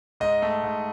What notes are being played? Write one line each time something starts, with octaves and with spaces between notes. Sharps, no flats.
G#2 D#5
A3
G#2